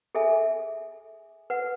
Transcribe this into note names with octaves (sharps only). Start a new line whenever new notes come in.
G#4 A4 E5 G#5
B4 F#5